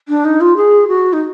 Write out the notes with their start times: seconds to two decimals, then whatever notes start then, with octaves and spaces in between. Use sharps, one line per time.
0.08 D4
0.24 D#4
0.41 F4
0.56 G#4
0.88 F#4
1.13 D#4